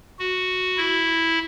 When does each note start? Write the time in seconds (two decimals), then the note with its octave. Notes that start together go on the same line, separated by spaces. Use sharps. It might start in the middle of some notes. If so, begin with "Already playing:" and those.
0.19 F#4
0.77 E4